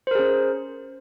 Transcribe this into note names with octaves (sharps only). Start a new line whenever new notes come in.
C#4 G#4 A#4 C5